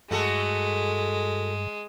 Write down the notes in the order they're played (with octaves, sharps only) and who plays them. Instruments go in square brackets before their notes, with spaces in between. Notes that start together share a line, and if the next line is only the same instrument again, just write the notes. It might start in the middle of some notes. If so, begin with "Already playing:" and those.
[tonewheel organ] G2 [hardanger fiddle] G#3 [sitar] A3 F#4 A4